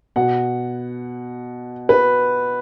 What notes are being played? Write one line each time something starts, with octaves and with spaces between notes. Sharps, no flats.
B2 F#5
B4